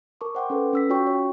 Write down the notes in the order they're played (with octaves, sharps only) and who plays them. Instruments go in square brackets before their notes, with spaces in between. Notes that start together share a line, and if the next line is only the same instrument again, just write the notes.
[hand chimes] A#4 A5 C#6 D6
C5 E5 F#5 G5 C6 D6
C#4 A4 B4
C#4 E6 B6
C#4 F4 F#4 C#5 G5 C#6
C#5 G5